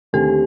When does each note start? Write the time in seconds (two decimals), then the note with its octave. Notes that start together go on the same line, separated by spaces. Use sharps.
0.13 D#2 D3 A3 C4 G4